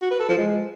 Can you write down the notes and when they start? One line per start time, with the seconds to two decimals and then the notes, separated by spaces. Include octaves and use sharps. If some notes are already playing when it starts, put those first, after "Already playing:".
0.02 F#4
0.11 B4
0.20 A4
0.29 F3
0.37 G#3